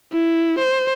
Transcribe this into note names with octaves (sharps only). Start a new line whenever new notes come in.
E4
C5